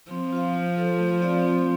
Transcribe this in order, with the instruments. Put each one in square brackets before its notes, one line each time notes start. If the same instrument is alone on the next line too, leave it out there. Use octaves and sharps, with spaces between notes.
[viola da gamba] F3 [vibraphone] C4
[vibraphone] F4 C5 F5
F4
A4 F5
A3
C4 F4 D5 F5
C4